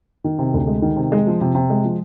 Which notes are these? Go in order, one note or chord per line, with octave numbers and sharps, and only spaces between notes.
D#3
C3
D2
G#3
D#3
C3
G#3
F3
C3
C3
G#3
F3